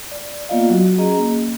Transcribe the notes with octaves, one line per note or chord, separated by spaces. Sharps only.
D5
A#3 B3 F4 D5 D#5 F5
F#3 F#4
C#4 G#4 D#5 A#5
A#3